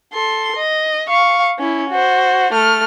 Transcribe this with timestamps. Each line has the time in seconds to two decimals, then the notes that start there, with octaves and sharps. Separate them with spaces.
0.13 A4 C6
0.56 D#5
1.09 F5 C#6
1.58 C#4 E4
1.90 F#4 C5
2.52 A3 F6